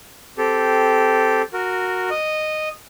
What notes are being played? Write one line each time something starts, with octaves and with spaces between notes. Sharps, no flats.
C4 G4 A4
F#4 A#4
D#5